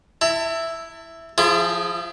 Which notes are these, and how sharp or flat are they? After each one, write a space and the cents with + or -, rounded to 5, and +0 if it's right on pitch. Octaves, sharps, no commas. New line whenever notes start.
E4 +0 A5 +35
F3 +0 E4 +40 G#4 +0